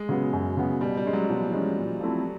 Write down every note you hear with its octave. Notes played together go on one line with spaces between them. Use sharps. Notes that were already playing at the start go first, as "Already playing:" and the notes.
Already playing: G#3
C#3 F#3 B3
F#2
C#3 F#3 B3
B2 G3
G3
G#3 C#4
F#3
B2 F3
E3
G#3 C#4
A#2
F3 A3 C4 E4